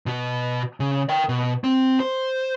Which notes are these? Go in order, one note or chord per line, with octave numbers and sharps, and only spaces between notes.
B2 F#4
C#3
A#4 G5
B2
C4
C5